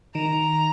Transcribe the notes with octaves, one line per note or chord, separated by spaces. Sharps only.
D#3 A#5